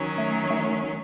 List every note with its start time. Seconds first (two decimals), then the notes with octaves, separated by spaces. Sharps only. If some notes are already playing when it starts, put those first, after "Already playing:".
Already playing: D#3 F#3 C#4
0.18 A3
0.50 A3